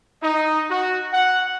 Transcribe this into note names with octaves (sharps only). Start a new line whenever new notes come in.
D#4
F#4
F#5